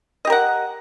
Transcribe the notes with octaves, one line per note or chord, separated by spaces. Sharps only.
G4 A#4 D#5 F#5